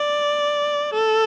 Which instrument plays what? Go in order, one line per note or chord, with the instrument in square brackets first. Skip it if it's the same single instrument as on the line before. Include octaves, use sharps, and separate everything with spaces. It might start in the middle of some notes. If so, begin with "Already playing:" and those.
Already playing: [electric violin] D5
A4